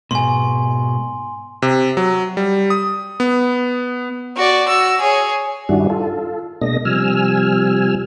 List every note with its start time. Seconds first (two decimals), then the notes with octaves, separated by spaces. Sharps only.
0.11 G#2 B2 G#5 C6
1.62 C3
1.97 F#3
2.37 G3
2.70 D#6
3.20 B3
4.36 F#4 D5
4.68 F#4 E6
5.01 G#4 C#5
5.69 G2 D#3 G3 D4 E4 F#4
5.90 F4 A4
6.61 B2 G#3 A#3 D4 D#5 A#6
6.85 C3 F3 G3 G#5 E6 F6